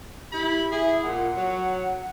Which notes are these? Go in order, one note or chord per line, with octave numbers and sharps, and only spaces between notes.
E4 G4 B5
E4 G#4 E5
A#2 F#5
F#3